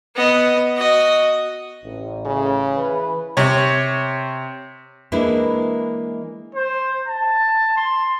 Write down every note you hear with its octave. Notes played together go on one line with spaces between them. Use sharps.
B3 D#5
F#4 D#5
A1
C#3
E3 B4
C3 C#5
E3 G#3 A#3 D4 E4 B4
C5
A5
C6